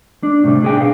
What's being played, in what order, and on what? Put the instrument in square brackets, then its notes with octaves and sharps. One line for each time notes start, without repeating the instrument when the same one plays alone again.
[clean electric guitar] D4
A2 C3 G3
D4 G#4 G5
B2 F5